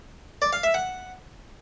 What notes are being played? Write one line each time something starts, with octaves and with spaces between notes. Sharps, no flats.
D5
F5
E5
F#5